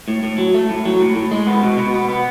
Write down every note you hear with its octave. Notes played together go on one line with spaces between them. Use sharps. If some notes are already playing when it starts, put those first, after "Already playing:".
A2
A2
F#3
A3
A2
F#3
A2
A2
G#3
B3
B2
B2
B3
B3